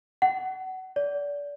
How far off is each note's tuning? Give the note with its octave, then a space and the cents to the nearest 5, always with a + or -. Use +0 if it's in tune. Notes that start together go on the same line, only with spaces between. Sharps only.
F#5 +25
D5 -30